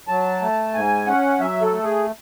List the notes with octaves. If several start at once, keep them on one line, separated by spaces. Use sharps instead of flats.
F#3 A5
A3
G#2 G#5
C#4 F#5
F#3 E5
A4
A3
G#4